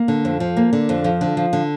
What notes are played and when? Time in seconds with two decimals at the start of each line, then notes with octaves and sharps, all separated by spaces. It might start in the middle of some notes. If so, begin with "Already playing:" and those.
Already playing: A#3
0.08 D3
0.25 F2
0.40 F3
0.57 A#3
0.73 D3
0.89 F2
1.04 F3
1.21 D3
1.37 F3
1.53 D3